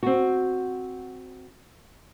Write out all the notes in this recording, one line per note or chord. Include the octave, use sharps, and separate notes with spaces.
C4 F#4